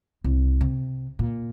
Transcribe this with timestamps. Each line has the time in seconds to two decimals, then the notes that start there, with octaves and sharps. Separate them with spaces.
0.24 C2
0.61 C3
1.19 A#2